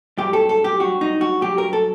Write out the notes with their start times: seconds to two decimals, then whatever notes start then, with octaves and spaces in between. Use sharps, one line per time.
0.18 G2 F#3 G4
0.33 A4
0.49 A4
0.64 G4
0.80 G2 F#3 F#4
1.01 D#4
1.21 F#4
1.41 G2 F#3 G4
1.58 A#4
1.73 A4